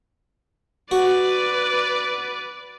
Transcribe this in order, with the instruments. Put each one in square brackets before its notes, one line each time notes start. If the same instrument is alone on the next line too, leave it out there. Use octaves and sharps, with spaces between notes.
[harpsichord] F#4 [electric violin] B4 D5